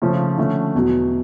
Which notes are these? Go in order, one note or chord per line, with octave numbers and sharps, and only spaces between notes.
C#3 F3 A3 C#4
D3 F3 A3 C#4
E2 B2 F#3